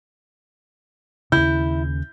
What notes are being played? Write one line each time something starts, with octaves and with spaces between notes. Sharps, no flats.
D#2 C#3 E4 G6